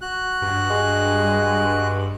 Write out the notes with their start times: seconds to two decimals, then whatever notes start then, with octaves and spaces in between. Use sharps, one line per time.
0.01 F#4 F#6
0.42 G2
0.70 G#3